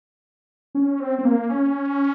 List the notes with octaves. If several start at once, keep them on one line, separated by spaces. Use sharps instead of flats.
C#4
C4
C4
A#3
C#4